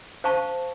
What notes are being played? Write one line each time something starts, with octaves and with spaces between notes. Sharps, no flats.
C5 F5 A5 C#6